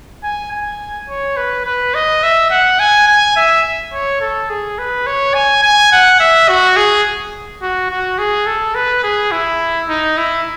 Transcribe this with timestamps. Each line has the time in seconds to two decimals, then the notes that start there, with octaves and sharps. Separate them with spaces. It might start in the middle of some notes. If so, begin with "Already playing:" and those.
0.24 G#5
0.52 G#5
1.09 C#5
1.37 B4
1.65 B4
1.94 D#5
2.23 E5
2.51 F#5
2.79 G#5
3.07 G#5
3.36 E5
3.93 C#5
4.21 A4
4.50 G#4
4.78 B4
5.06 C#5
5.34 G#5
5.63 G#5
5.92 F#5
6.20 E5
6.49 F#4
6.77 G#4
7.62 F#4
7.91 F#4
8.19 G#4
8.47 A4
8.75 B4
9.03 G#4
9.32 E4
9.89 D#4
10.17 E4